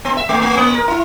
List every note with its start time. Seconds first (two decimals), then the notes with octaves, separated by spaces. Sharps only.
0.05 B3
0.17 E5
0.29 A3
0.41 A3
0.57 A#3
0.74 A#4
0.88 E4